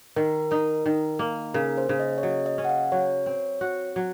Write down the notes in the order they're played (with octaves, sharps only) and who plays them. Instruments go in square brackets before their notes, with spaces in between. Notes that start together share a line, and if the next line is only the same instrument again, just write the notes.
[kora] D#3 [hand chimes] A#4
[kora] D#4 [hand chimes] A#4
[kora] D#3
A#3
[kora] C#3 [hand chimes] A#4
[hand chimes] C5
[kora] C#3
[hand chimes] D#5
C#5
[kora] F#3 [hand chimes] D#5
[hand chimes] D#5
[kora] C#4
[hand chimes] F#5
F5
[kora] F#3 [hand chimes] C#5
[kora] C4
F#4
F#3